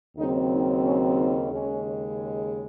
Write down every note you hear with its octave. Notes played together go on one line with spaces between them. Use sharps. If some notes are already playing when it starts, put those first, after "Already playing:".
D#2 C#3 F#3 C4 D#4
D#4
C#4
D#4
D#2 C#3 G#3 C#4
C#4